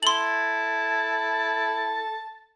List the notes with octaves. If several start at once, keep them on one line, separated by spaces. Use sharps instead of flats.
E4 A4 A5 C6 F#7